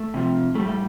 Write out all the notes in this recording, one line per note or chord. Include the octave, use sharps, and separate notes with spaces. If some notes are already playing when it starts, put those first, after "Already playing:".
Already playing: A3
C3 F3
A2 G3 A3
A3